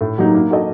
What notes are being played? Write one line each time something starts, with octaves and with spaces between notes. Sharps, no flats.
A2
F#3 A#3 D#4 G4
A#3
F#4 A4 D#5